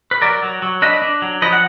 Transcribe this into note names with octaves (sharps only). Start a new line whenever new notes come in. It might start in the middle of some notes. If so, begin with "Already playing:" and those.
B4
F#3 A#4 D5
F#3
F#3
D4 B4 D#5
D4
F#3
F3 B4 D#5
F#5